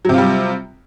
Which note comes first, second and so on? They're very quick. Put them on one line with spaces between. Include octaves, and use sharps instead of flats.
F#3 C3 F4 G3